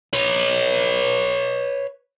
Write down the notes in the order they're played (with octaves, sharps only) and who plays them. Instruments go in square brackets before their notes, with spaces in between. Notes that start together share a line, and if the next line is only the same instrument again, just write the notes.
[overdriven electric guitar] B4 C#5